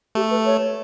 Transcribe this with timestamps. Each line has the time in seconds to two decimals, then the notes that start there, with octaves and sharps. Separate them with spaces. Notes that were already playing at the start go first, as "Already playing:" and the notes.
0.15 A3 G4
0.31 B4
0.46 C#5